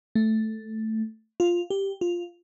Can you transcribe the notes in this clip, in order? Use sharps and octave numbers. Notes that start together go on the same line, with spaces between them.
A3
F4
G4
F4